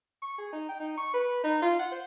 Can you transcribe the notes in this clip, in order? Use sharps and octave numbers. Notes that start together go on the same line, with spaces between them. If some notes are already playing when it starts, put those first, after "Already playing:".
C#6
G#4
D#4
G5
D#4
C#6
B4
D#4
F4
F#5
C5